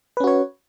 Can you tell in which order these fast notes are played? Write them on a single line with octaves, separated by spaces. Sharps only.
B4 C#4 F#4 C#5